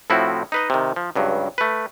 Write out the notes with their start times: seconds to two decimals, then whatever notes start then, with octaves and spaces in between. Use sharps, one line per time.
0.10 A2 F3 C4 E4 F#4
0.52 D#4 B4 D#5
0.70 C3 D#3
0.96 F3
1.16 C#2 G2 F#3
1.58 A3 B4